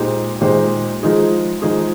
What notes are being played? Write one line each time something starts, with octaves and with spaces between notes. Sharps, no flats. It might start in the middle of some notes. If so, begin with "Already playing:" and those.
Already playing: A#2 G#3 D#4 G4 C5
A#2 G#3 D#4 G4 C5
F3 G#3 D#4 G#4
F3 G#3 D#4 G#4